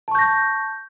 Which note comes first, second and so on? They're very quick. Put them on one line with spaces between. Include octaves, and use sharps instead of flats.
A5 C#6 G6 A#6